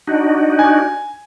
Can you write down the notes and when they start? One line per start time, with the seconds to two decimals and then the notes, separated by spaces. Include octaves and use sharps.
0.07 D4 D#4 F#4
0.59 G#5